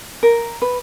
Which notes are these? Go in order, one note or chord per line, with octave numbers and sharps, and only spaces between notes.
A#4
B4